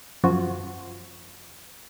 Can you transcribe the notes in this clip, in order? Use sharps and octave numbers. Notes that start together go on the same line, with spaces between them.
F#2 F3 F4 F#4 G#6